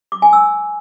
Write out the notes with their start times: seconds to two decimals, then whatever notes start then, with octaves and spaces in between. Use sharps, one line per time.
0.12 D6
0.22 G#5
0.33 E6